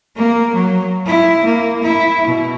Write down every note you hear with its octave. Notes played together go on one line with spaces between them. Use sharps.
A#3
F#3
E4
A#3
E4
B2